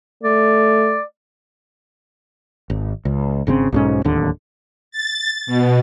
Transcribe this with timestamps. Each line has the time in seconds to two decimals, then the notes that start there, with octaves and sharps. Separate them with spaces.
0.23 A3 D5
2.70 G#1
3.05 C#2
3.47 G#1 C#3 F3 C4
3.72 B1 G#2 C#4
4.05 D1 D#2 D3
4.91 A6
5.47 B2